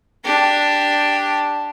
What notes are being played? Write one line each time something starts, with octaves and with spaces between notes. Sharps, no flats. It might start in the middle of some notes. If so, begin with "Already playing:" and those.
D4 G4